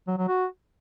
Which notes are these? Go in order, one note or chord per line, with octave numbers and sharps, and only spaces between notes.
F#3
F#3
F#4